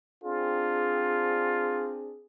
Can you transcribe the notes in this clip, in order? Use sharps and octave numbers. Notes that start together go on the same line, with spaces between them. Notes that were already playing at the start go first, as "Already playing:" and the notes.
C4 D4 F4 G#4